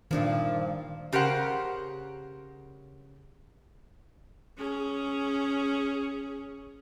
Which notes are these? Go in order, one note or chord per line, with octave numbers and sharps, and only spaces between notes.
G2 A#2 D#3 F3 D4
C#3 G4 A#4 C5 F#5
C#4 G#4